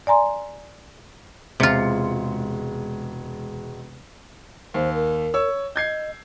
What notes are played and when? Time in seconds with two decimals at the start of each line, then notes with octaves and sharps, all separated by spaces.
0.07 D5 G#5 A#5 C6
1.60 E1 C3 G#3 F4 C#7
4.74 D#2 C5
4.94 A#4
5.34 C#5 E6
5.76 D#5 G6 G#6 C7